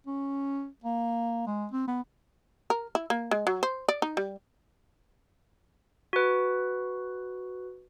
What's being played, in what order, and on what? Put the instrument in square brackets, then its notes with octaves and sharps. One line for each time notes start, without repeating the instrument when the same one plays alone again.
[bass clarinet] C#4
A#3
G#3
C4
B3
[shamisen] A#4
E4
A#3
G#3
F#3
C5
D5
D#4
G3
[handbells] F#4 B4